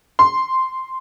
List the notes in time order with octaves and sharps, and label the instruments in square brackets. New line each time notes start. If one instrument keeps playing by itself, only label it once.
[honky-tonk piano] C6